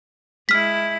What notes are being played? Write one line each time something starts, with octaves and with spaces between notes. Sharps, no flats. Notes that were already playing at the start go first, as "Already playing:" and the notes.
G#3 E4 F6 B6